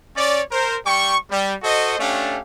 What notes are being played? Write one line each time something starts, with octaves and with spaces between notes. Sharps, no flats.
C#4 C#5 D5
A#4 C5
G3 G5 C#6
G3
F#4 A4 C5 D#5
A3 C#4 D4 G4 F5